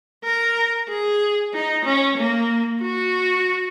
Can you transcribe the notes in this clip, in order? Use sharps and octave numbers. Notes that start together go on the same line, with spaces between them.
A#4
G#4
D#4
C#4
A#3
F#4